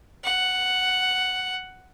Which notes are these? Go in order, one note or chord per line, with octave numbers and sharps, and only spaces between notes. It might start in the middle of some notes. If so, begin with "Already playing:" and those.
F#5